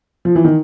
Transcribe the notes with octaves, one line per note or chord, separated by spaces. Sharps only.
F3
E3
D#3